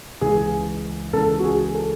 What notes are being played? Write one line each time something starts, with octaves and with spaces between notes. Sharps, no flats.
C#2 C#3 E3 G#4
C#2 C#3 E3 A4
F#4
G#4
A4